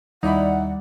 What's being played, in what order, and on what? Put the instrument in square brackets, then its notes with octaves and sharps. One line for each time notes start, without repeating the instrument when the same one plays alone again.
[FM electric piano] D#2 D5 [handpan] G3 [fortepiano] D#4 E4 B5 [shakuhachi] F#5